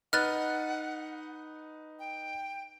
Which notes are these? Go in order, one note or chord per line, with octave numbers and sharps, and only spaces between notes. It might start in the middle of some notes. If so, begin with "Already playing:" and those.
D#4 B4 F#5 F6 F#6 A6
G5